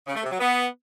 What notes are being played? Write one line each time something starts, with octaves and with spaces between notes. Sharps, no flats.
C#3
A3
C3
F#3
B3